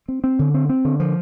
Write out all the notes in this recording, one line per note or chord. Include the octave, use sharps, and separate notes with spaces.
C4
C4
D3
C4
C4
D3
F3